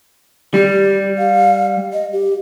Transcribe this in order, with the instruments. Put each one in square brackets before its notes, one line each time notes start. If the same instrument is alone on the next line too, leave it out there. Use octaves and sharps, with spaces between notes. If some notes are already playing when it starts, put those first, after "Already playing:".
[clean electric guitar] G3 [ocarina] G4
[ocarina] F5
D#5
G4